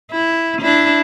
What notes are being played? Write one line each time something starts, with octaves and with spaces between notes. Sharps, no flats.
E4
D4 E4